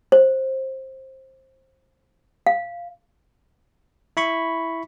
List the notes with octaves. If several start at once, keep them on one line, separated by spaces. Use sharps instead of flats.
C5
F5
E4 B5 C#6